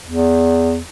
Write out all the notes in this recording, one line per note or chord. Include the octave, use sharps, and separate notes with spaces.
E2